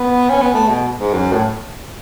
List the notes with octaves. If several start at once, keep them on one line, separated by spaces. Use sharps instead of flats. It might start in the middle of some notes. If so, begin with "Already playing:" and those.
Already playing: B3
C#4
B3
A3
B2
G#2
F#2
A2